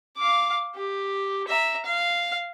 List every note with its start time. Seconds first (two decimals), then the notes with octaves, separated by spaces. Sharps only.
0.17 F5 D6
0.76 G4
1.48 E5 A#5
1.85 F5